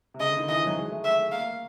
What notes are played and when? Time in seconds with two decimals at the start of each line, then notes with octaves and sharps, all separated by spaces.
0.14 C3
0.20 C#3 D#5
0.30 D3
0.39 D#3
0.48 E3 D#5
0.58 F3
0.67 F#3
0.77 G#3
0.90 A3
1.04 A3 E5
1.19 A3
1.32 A#3 F5